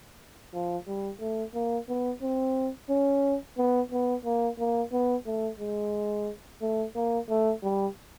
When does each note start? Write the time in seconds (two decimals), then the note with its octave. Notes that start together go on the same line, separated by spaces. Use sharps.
0.54 F3
0.87 G3
1.20 A3
1.54 A#3
1.89 B3
2.22 C4
2.90 C#4
3.58 B3
3.92 B3
4.25 A#3
4.59 A#3
4.92 B3
5.26 A3
5.60 G#3
6.62 A3
6.95 A#3
7.29 A3
7.63 G3